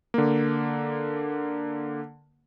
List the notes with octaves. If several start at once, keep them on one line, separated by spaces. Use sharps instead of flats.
D3 A#3